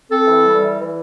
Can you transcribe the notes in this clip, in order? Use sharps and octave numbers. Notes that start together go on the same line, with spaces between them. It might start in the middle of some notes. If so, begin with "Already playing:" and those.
C4 A4
E3
G3
E3
E3